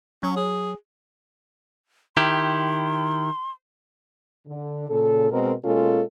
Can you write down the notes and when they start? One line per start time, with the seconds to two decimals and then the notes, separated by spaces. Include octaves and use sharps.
0.23 F#3 C#4
0.36 G#4
2.17 D#3 E4 G4 C6
4.47 D3
4.89 A#2 C#3 A4
5.31 B2 G#3 C4 A#4
5.64 B2 G#3 A#3 C#4 F4 A4